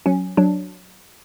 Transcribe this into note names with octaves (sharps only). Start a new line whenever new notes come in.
F#3 C#4
F#3 D4